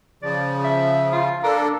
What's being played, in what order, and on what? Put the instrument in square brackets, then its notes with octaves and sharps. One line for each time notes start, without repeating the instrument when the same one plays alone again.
[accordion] C#3 F3 [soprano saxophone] D5
[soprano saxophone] E5
F4
[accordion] A#3 D4 A4 [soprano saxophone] A#4